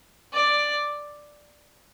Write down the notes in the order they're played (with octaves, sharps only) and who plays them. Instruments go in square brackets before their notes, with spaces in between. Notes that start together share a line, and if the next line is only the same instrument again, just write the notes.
[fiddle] D5